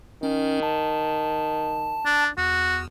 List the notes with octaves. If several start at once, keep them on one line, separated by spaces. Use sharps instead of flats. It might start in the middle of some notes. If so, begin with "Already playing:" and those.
D#3 C#4
A5
D4
E2 F#4